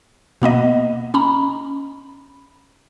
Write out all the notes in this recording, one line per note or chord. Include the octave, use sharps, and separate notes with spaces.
B2 A#3 B3 D#5
C#4 A#5 B5